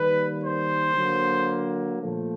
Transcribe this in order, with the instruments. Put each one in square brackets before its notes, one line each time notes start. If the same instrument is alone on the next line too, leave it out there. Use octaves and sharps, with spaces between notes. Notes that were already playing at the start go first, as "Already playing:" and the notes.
Already playing: [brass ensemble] D#3 G3 A#3 B4
C5
D3 F#3 A#3
A#2 F3 A3